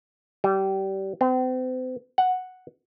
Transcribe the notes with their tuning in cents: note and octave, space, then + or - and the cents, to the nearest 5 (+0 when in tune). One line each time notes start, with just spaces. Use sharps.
G3 -25
C4 -40
F#5 -5